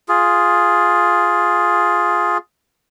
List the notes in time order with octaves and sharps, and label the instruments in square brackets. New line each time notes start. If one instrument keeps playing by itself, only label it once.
[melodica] F4 G#4